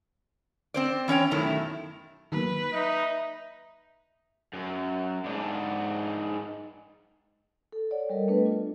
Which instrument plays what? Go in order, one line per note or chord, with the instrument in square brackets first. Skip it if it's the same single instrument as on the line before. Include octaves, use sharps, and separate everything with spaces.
[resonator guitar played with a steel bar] C4 C5 D5
E3 C#4 C#5 G5
F#2 B2 D#3 A3 E4
[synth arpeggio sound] D#3 F#3 A#3 [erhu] B4
[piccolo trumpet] D#4 [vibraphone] E5
[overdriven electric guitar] F#2
G#2 D4
[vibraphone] A4
C#5 D5 F#5
G3 A4 A#4 D#5
A3 B3 D4 A4 B4
D4 F4